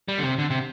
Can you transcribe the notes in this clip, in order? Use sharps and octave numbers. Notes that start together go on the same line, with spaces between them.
G3
D3
C3
D3
C3